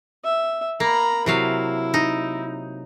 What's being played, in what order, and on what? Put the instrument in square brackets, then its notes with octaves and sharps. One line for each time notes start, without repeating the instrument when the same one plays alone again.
[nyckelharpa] E5
[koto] A#3 [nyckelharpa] A#5 B5
[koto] C3 F#3 F5 [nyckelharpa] E4
[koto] D#4